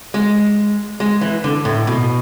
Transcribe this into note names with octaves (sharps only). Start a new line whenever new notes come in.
G#3
G#3
E3
D3
A2
B2